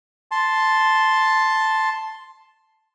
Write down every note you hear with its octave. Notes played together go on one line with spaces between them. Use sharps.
A5 C6